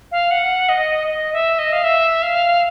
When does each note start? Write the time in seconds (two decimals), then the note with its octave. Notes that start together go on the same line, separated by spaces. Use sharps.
0.11 F5
0.31 F#5
0.69 D#5
1.07 D#5
1.33 E5
1.59 D#5
1.72 F5
1.84 E5
2.22 F5